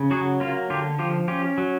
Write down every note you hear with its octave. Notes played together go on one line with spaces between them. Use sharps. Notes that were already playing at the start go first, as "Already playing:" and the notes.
Already playing: C#3
F#3 F#4 G#4
A#3 F4
D3 F4 G4
F3 F4 G4
C#4 F4 G4
F#3